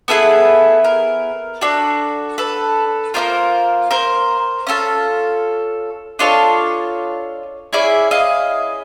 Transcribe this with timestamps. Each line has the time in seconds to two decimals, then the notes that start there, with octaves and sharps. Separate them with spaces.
0.08 B3 E4 G#4 A4 B4
0.84 A#4
1.61 D4 F#4 A4
2.38 A4 B4
3.14 A#3 D4 F4 A#4 C5
3.91 A#4 C5
4.67 C#4 F4 A4
6.19 D4 F4 A4 C#5 D#5
7.73 C#4 E4 G#4 D5 E5
8.11 D#5 F5